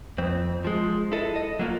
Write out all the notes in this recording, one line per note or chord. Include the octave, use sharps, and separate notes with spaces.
F2 C4
F3 G#3
E4 A4 D#5
D#5
F#3 A#3 F4